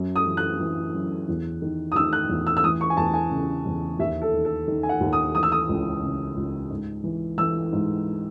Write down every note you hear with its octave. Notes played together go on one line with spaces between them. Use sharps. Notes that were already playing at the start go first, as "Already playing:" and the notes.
Already playing: F#2
D#6
E3
F#6
E3
F#2
E2
D#3
D#6
D#3 E6
F#6
E2
E6
E6
E3 D#6
C#6
G#5
E2 A5
G#5
C#3
E2
D#2 E5
A4
D#3
A4
D#3
G#5
F#5
D#2
D#6
E3 D#6
E6
D#6
C#2
C#3
C#2
G#2
E3
E3 E6
G#2